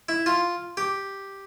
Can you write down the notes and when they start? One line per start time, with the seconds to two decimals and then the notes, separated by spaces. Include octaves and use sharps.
0.09 E4
0.26 F4
0.77 G4